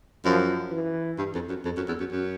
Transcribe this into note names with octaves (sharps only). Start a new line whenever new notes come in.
F#2 F3
E3
G2
F2
F#2
F2
F#2
E2
F#2
F#2